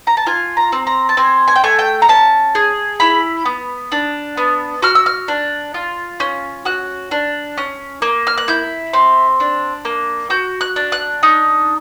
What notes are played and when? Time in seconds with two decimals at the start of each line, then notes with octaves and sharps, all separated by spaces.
0.07 A#5
0.17 A5
0.26 F4 G#5
0.57 A#5
0.72 C4
0.87 A#5
1.09 A5
1.17 C4 G#5
1.48 G#5
1.56 G5
1.64 A3 G#5
1.79 G5
2.02 A#5
2.09 C#4 A5
2.55 G#4
3.00 E4 B5
3.45 B3
3.92 D4
4.37 B3
4.82 F#4 F6
4.95 E6
5.06 F6
5.28 D4
5.74 F4
6.20 C#4
6.65 F#4 F#6
7.11 D4
7.58 C#4
8.02 A#3
8.27 F6
8.38 F#6
8.48 E4 G6
8.93 C4
9.40 D4
9.85 A#3
10.30 F#4 G6
10.61 F#6
10.76 D4
10.92 F#6
11.23 D#4